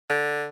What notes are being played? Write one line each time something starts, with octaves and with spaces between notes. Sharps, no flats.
D3